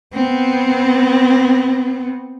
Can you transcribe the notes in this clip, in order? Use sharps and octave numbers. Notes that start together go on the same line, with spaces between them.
B3 C4